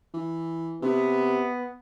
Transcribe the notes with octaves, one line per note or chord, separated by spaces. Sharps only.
E3
C3 B3